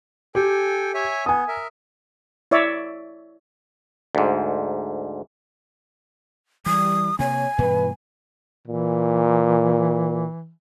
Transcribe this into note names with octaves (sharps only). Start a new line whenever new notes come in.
G4 A4 G5 G#5
C#5 E5 G#5
B3 G#5 D#6
A#4 E5
E4 C#5 D5 E5
D2 G#2
E3 G3 D#6
C3 A#3 C#5 G#5
G2 B2 E3 B4
A#2 E3